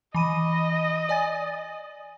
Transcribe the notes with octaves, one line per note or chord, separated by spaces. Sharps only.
E3 D#5 B5 D#7
D5 G#5 A6